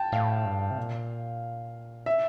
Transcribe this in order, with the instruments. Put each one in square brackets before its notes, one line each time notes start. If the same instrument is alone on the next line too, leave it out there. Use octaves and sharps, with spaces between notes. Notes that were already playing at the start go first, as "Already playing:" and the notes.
Already playing: [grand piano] G5 A5
[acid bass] A2 [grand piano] F5
[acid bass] G2
C3
A#2
[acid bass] C3 [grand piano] E5